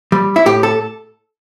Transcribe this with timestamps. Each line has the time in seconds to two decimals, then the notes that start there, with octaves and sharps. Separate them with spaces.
0.12 G3
0.36 E4
0.46 A2 G4
0.63 A4